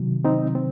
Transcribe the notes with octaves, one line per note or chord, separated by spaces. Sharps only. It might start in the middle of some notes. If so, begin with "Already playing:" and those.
Already playing: C3 D#3 F#3
C4 D#4
C4